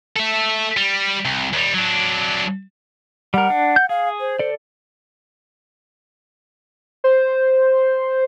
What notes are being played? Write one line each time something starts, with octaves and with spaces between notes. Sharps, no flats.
A4 E5
G3
C2
D#2 G3
F#3 D4
G3 A#4 F#5
D4
G6
G#4 F5
C5
A4 D5
C5